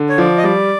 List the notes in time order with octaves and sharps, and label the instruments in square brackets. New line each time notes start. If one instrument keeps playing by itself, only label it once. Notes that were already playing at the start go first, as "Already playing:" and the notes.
Already playing: [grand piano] D3
[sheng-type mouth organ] C#5
[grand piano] F3 [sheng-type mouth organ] D5
[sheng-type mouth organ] D#5
[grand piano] G3 [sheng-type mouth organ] D5